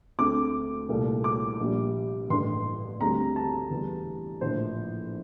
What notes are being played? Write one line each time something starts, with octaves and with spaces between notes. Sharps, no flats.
D2 D3 A3 C4 D6
C2 A#2 A3
D6
A#1 A#2 G3
A1 G2 D3 C6
D2 D3 G3 C4 A#5
A5
E2 E3 G3
A#1 A2 F3 C5